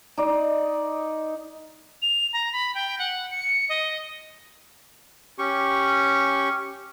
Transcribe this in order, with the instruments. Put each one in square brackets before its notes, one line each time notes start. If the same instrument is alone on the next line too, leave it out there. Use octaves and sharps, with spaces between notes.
[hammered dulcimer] D#4 D5 D#5
[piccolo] F7
A#5
B5
G5
F#5
C#7
D#5
[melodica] C#4 G4 C#6